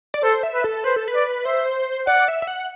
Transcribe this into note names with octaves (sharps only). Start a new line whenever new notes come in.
D5
A4 C5
E5
B4
A4
B4 C5
A4
B4
D5
C5 E5
D5 F#5
E5
E5
F#5